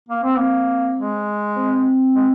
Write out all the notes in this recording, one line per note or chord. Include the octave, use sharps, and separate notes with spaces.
A#3
C4
A#3 C4
G#3
C4
G#3